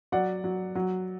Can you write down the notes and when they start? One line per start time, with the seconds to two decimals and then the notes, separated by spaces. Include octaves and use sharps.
0.12 F#3 D5 F#5
0.44 F#3
0.75 F#3